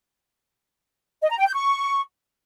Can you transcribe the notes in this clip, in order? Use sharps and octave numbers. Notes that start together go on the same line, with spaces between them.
D#5
A#5
G5
G6
C#6